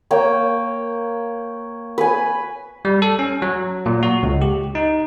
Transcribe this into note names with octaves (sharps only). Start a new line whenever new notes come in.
A#3 C#5 G5
B4 G#5
G3
A4
C#4
F#3
A#2
F#4
C#2
G4
D#4